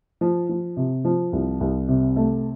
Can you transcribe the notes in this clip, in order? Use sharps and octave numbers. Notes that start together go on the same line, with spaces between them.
F3
F3
C3
F3
C2
C2
C3
A3